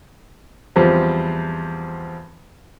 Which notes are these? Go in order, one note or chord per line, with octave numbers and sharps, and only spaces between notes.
E2 F3 G3 C4